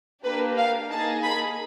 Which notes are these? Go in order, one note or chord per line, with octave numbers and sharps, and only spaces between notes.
A#3 D4 G4 B4
F5
A#3 D#4 G#4 A5
B5